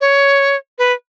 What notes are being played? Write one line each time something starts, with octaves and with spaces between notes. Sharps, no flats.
C#5
B4